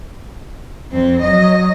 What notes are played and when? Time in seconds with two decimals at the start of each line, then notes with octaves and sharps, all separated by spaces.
0.91 F2 C4
1.22 F#3 D#5